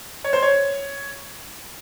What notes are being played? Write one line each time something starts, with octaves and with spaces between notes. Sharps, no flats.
C#5
C5
C#5